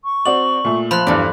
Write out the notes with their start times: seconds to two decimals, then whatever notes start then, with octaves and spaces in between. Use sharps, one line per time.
0.04 C#6
0.26 C4 F#4 D5 F#7
0.65 A#2 A3
0.91 F3 A5 B5 C6 F#6
1.07 E2 G2 D4 A4